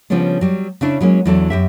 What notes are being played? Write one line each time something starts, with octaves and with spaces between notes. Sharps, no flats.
C#3 F3 G3 B3 C#4 D4
F#3 G3
C#3 C#4 D4 E4
F#3 G#3 A#3 C#4
E2 E3 F#3 D4 A4
F#2 G4 E5